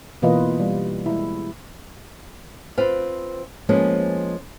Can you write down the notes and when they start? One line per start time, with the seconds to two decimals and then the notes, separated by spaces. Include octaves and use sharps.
0.22 B2 E3 A#3 F4 B4 D#5
0.60 G3
1.06 G#3 E4
2.78 C4 F4 B4 F5
3.69 F3 G#3 A#3 B3 C#4